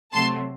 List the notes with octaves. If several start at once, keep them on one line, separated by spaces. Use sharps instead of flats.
C3 F#3 A3 A5 C6